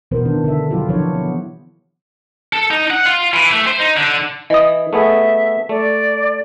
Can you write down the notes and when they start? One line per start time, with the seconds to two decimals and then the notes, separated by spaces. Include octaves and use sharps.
0.11 B2 E3 B3 A#4 C5
0.25 D#3 B3 D4
0.44 D3 D4 E5
0.70 F#3 E4 F4 G4
0.89 E3 F3 D4 C#5
1.15 B3
2.53 A4
2.71 D#4
2.90 F#5
3.06 F4
3.34 E3
3.52 A3
3.67 C5
3.80 D#4
3.97 D3
4.50 E3 D#5 D#6
4.93 A3 B3 G#4 E5
5.69 A3 D5